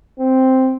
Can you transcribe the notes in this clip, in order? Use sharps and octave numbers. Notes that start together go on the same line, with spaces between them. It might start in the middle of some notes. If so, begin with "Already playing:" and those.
C4